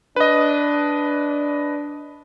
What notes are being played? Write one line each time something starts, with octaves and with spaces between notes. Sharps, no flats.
D4 B4 D#5